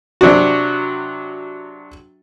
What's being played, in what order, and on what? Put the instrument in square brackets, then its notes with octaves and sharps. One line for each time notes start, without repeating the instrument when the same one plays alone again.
[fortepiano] C3 F#3 D4 F#4